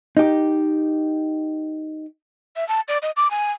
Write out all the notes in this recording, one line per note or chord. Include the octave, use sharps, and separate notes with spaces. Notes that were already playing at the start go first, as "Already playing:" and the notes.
D#4 G4
E5
A5
D5
D#5
D6
G#5